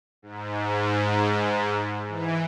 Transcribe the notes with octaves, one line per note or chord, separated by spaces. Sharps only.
G#2
E3